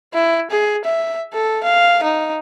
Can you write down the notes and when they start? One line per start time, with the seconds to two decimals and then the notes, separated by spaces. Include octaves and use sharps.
0.14 E4
0.51 G#4
0.85 E5
1.34 A4
1.64 F5
2.03 D#4